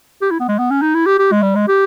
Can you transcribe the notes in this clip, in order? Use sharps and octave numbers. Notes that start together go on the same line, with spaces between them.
G4
E4
B3
G#3
B3
C#4
D#4
E4
G4
G4
G#3
G3
G#3
G4